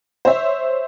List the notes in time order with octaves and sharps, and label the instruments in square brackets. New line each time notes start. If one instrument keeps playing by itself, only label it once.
[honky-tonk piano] C5 C#5 E5